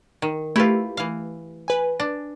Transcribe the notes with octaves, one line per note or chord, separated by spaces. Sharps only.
D#3
A3 E4 F4 G4 B4
E3 F5
B4 G#5
D4